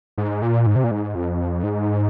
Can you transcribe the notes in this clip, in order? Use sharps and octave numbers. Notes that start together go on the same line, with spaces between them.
G#2
A#2
G#2
C3
A#2
G#2
F2
G#2